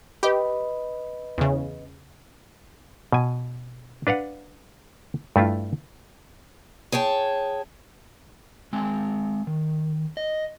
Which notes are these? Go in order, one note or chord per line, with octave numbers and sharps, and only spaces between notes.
G4 B4 D#5 B5
E2 C#3
B2 G#5
D4 B4 F5 F#5
G2 A3 E4 F4
G#4 C#5 G5 A5
G#3 C4 G#5
D#3
D#5